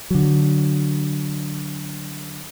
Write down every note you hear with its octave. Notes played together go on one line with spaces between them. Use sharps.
D3 F#3